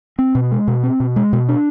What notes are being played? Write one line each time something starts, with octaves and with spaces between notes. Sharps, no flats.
C4
B2
G#3
B2
C4
B2
G#3
B2
D4